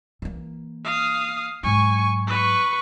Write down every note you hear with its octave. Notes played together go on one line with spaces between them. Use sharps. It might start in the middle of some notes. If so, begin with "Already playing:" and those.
E3 A#3
F5 D#6
G#2 F#3 G#5 C#6
B4 C#6